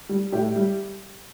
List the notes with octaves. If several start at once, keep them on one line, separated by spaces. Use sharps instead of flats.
G3
A2 G4
G3